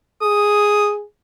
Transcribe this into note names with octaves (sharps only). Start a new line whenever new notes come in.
G#4 D#6